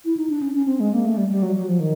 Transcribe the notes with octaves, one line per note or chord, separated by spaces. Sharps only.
E4
D#4
D4
C#4
C#4
C4
G#3
A#3
A3
G3
G3
F#3
F#3
F3
D#3